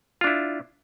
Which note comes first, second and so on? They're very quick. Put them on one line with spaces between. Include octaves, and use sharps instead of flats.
F4 D4 E4